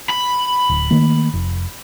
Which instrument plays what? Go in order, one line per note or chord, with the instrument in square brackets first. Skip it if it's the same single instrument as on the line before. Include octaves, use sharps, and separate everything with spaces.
[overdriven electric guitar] B5
[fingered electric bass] D1
D#3 A3 A#3
F1